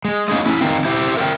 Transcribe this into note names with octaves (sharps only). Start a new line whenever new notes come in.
G#3
A#3 C#4 D#4 G#4 D#5
C#4 E4
D#3 A#3 C4
E4 G4 C5 E5
A#4 E5 F#5 G5